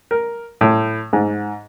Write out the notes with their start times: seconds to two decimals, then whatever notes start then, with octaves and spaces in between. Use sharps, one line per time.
0.11 A#4
0.61 A2
1.13 G#2